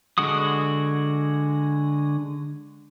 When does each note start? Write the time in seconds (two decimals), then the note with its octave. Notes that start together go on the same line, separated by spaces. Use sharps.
0.18 D3 G#3 F#4 D#6